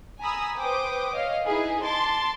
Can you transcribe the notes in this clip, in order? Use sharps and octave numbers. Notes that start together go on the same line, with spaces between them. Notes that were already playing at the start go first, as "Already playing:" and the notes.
G#5 A#5 B5 D#6 E6
B4 C5 G5 D6 D#6
C#5 D#5 F5
D#4 E4 G#4 B4
A5 C6 D6 A6